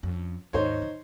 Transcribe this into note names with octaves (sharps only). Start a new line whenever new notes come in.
F2 C#4
D#2 G#2 D#4 C5 C#5
D3